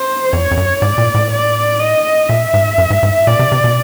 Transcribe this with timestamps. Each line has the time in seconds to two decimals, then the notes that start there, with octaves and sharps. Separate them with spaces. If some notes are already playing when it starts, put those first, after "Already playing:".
Already playing: C5
0.32 F2 C#5
0.51 F2
0.57 F#2
0.82 G#2 D5
0.98 A#2
1.14 A2
1.31 D5
1.80 D#5
2.29 A#2 E5
2.54 G#2
2.78 F#2
2.90 G#2
3.03 G#2
3.27 A#2 D5
3.39 C3
3.52 C3
3.64 B2